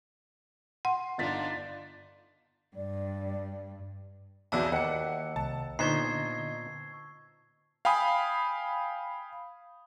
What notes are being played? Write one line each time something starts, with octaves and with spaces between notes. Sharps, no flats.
F#5 C6
G1 D4 D#4 F4 A6 B6
G2 D5
B1 E2 B2 D5 E5 A5 D6 E6
D#2 F#5 C#7
C2 A5
A#2 D3 B3 D#4 C5 C#6 G#6 C7
F5 G5 G#5 B5 D#6